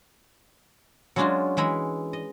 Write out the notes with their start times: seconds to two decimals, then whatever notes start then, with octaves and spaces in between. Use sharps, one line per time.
1.16 F#3 G#3 C#4 D4 F4 F#4
1.57 E3 G#3 E5 A#5 B5
2.13 D#5